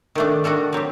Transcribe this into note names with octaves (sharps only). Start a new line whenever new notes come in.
D#3 A3 D4
D#3 G3 D4 F#4 A4
F#3 C4 G4